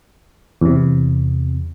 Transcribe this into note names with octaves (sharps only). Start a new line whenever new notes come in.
E2 C3